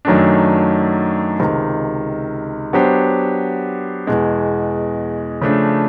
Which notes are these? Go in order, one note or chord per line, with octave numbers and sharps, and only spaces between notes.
F#2 D#3 F#3 A3 D4
C#2 C3 D#3
F#3 B3 D4 G4 C5
E2 B2 G#3
C#3 F3 A3 D4